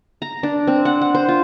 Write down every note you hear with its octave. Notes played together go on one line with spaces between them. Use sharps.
A#5
D4
C4
F#5
F#5
C5
F4